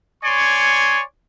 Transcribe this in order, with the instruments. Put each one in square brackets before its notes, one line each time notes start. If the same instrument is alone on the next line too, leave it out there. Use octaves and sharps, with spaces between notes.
[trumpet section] C#5 D5 G#5 C6 C#6